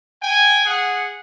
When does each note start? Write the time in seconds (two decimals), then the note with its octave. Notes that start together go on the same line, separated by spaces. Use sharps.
0.22 G5 G#5
0.66 G#4 F#5